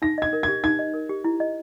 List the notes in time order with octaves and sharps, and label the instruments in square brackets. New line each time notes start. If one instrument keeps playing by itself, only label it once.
[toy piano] D#4 [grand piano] A#6
[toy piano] D#5 [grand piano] G#6
[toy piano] A#4
[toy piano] G4 [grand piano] G#6
[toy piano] D#4 [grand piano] G#6
[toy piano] D#5
A#4
G4
E4
D#5